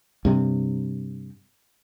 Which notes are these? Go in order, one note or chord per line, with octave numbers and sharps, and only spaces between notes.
G2 C3